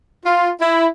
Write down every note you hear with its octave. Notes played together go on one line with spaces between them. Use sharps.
F4
E4